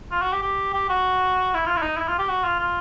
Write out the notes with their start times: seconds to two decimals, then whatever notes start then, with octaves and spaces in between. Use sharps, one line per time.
0.12 F4
0.22 F#4
0.32 G4
0.43 G4
0.74 G4
0.89 F#4
1.54 E4
1.66 F4
1.77 E4
1.82 D#4
1.97 E4
2.08 F4
2.18 G4
2.29 F#4
2.44 F4
2.59 F4